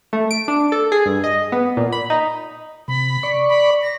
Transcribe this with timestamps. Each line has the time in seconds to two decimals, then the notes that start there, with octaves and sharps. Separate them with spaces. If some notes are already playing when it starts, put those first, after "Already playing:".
0.13 A3
0.31 D7
0.48 D4
0.72 A4
0.92 G#4
1.06 G2
1.24 D#5
1.52 B3
1.77 A#2
1.92 B5
2.10 D#4
2.88 C3 B5
3.23 D5 C#6
3.49 B5
3.82 A#6